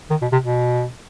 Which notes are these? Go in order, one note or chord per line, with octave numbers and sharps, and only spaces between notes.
D#3
B2
C3
B2